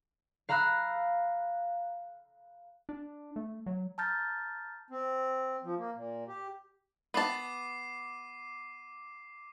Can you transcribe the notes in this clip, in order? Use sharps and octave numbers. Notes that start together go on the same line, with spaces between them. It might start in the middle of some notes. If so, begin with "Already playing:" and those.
F5 A#5 B5 E6 F#6
D4
A3
F#3
A5 A#5 F6 G6 A6
C4
F3
A#3
A#2
G4
B3 A5 D6 C7 D#7